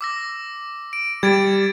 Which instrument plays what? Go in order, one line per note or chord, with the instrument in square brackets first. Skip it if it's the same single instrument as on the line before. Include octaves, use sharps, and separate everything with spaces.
[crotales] D6 E6 A#6
D7
[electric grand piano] G3 [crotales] G#6 A6 D7